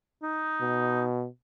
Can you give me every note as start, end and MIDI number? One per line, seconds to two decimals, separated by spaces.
0.23 1.04 63
0.62 1.26 47